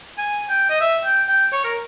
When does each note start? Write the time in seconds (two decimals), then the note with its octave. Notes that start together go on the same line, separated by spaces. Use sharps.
0.18 G#5
0.49 G5
0.69 D#5
0.81 E5
1.05 G5
1.29 G5
1.52 C#5
1.64 A#4